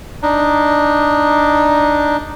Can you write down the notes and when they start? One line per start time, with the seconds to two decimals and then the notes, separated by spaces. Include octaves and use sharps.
0.23 D4 D#4